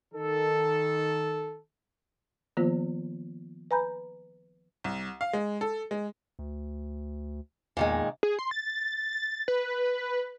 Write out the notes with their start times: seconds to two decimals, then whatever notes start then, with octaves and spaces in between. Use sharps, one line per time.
0.14 D#3 A4
2.57 D#3 F3 A#3 B3 F4 C5
3.71 B4 G#5 A#5 B5 G6
4.84 C2
5.21 F5
5.33 G#3
5.61 A4
5.91 G#3
6.39 D2
7.77 E2 A#2 D#3 G#3
8.23 G#4
8.39 C6
8.51 A6
9.13 A6
9.48 B4